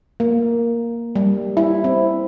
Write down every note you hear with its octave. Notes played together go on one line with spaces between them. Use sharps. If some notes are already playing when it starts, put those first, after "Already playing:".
A#3
G3
E4
C4